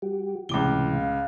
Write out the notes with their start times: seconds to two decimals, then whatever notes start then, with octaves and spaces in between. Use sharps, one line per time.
0.02 G3 F#4 G4
0.49 C#2 A2 C3 E3 D6 G7
0.91 F5